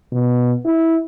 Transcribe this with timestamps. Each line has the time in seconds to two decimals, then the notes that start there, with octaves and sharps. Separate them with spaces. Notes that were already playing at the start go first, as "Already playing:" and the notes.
0.13 B2
0.65 E4